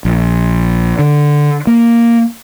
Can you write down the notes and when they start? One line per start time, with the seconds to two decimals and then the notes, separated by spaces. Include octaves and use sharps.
0.05 A#1
0.99 D3
1.67 A#3